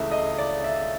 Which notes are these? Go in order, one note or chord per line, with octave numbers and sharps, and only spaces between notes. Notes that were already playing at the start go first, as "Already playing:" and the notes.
Already playing: C#2 C#3 E3 A3 E5
D#5
D5
E5